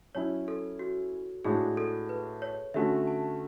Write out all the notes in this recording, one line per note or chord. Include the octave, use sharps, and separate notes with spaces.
F#3 C#4 E4 C#5
A4
F#4
A2 G#3 D4 F#4 G#4
A4
B4
C#5
D3 A3 C#4 F#4 E5
A5